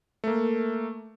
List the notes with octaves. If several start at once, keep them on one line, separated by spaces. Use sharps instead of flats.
A3 A#3